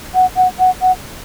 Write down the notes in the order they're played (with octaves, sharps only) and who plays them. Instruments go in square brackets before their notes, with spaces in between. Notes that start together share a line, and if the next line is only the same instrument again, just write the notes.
[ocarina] F#5
F#5
F#5
F#5